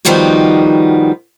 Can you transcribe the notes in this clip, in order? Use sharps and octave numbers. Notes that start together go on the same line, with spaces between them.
D#3 F3 G3 B3 D#4 F#4